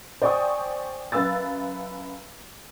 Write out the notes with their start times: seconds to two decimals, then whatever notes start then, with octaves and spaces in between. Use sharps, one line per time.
0.22 C5 D5 G5 G#5 C#6 D#6
1.12 F#2 B4 F5 E6 A6